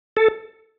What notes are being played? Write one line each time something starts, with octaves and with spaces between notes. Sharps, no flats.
A4